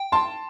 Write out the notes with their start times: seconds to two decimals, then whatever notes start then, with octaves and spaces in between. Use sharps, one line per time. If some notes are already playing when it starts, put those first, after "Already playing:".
Already playing: G5
0.12 A5 C6